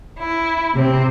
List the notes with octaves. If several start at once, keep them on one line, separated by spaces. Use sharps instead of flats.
E4
C3 C4